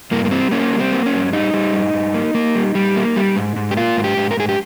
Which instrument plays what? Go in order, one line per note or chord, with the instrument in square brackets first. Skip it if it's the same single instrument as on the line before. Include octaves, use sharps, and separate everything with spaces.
[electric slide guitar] G2 A#3
A#3
G3 C4
A#3 C#4
G3
C4
A#3
C#4
G2
G3 D#4
G3
G2
G2
A#3
A#3
G3
G3
A#3
G3
G#2
G#2
G4
A#3 F4
G#2
G4
G#2
A#4
G#2 G#4
G4